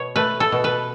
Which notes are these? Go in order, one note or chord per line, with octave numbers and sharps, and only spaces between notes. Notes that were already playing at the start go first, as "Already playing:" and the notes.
Already playing: B2 C#5
A3 B4
A4
B2
B4